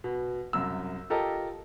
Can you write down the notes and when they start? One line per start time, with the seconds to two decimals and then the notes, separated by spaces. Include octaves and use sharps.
0.04 B2
0.53 C2 F#2 E6
1.10 F4 G4 A4 A#4 D#5